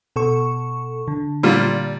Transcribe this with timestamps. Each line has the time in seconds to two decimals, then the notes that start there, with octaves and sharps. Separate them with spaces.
0.16 B2 A4 C#6
1.08 D3
1.43 A#2 G3 F4